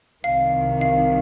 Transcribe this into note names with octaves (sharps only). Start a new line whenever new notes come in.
C2 C3 D#3 F5
F5